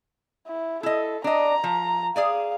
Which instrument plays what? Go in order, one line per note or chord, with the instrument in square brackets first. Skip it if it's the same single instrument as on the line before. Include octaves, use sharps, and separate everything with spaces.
[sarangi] E4
[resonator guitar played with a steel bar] E4 D#5 [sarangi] A4
[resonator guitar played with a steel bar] D4 D#5 [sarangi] A#5
[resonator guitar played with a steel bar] F3
[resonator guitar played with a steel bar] G#4 D5 G#5 [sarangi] F5